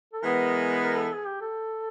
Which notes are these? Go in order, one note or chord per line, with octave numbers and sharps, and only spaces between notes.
A4
E3 G#3 B3 A#4
A#4
A4
G#4
G4
A4